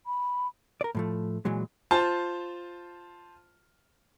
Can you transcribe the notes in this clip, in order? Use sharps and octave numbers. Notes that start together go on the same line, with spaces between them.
B5
A#4 D5
A2 F3 A3
A#2 E3 F#3 G#3
F4 C5 A5